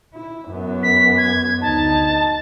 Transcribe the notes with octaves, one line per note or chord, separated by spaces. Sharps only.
E4
F#2 B3
B6
G#6
D2 D#4 A5